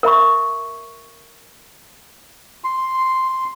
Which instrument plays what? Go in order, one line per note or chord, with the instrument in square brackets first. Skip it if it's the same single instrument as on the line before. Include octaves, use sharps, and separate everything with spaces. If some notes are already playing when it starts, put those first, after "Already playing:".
[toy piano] A#4 E5 B5 C#6
[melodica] C6